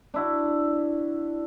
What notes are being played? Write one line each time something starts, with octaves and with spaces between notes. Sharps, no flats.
D4 E4 F#4